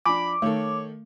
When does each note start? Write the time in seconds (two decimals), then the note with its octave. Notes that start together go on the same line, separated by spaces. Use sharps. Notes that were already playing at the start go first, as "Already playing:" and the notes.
0.06 F3 D4 G#5 B5 D6
0.42 D#3 A3 A4 C#5